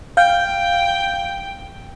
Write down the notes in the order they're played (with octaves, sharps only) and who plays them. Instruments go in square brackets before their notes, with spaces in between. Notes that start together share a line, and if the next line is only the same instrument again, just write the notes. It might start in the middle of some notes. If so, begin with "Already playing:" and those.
[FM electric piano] F5 G6 [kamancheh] G5